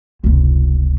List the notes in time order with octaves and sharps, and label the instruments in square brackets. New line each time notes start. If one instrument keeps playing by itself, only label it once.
[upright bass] F1 C#2